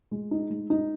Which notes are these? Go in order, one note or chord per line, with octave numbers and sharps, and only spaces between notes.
G#3
D#4
G#3
D#4